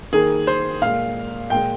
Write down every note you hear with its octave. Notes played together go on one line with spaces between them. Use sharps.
D#3 A#3 G#4
C5
A#2 G#3 F5
A#2 G#3 G5